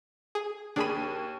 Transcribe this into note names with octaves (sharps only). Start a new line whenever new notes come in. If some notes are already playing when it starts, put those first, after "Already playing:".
G#4
D#2 D4 G#4 B5 D#7